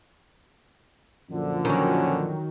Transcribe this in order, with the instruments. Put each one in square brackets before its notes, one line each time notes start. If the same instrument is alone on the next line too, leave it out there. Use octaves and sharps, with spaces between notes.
[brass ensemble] F#2 A#2 D3 [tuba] F3
[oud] D#3 F#3 [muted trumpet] C#4